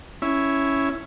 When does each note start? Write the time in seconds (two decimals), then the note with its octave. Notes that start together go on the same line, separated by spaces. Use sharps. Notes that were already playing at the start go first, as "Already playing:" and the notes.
0.22 C#4 E4